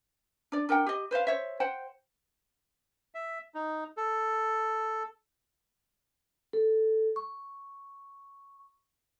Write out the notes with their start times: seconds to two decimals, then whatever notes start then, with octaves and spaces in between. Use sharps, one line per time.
0.52 D4 D5
0.69 D4 A#4 F#5 G5
0.87 G4 D#5
1.11 B4 C5 D#5 F5
1.27 C5 C#5 E5
1.60 C5 F#5 G5
3.15 E5
3.54 D#4
3.97 A4
6.53 A4
7.16 C#6